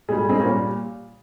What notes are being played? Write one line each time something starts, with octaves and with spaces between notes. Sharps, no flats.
A#2 G3 G#3
G#3
G#3 C4
A#2 G3 A#3 C#4